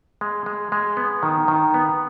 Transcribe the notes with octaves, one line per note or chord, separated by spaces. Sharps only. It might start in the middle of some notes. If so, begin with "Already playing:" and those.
G#3
G#3
G#3
B3
D#3
D#3
B3